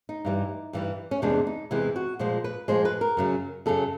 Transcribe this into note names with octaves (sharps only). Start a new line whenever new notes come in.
D#4
G2 E3 G3
G2 E3 G3
C#4
E2 C3 E3 G#3 D4
D#4
E2 C3 E3 G#3 E4
F#4
A#2 F3 G#3 C5
B4
A#2 F3 G#3 C5
B4
A#4
F#2 C#3 F#3
F#2 C#3 F#3 A4